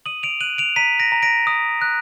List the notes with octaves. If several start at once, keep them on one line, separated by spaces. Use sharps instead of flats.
D#6 D#7 F#7
D7 F7
F#6 D#7 F#7
D7 F7
A#5 B6 D#7
A#6 D7
A#5
A#6 D7
D#6
F#6